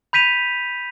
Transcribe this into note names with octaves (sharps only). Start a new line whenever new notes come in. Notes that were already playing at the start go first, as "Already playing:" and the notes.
B5 G6 B6 D#7 F7